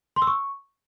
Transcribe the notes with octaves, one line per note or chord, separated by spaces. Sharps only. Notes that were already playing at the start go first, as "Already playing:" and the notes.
C6
E6
C#6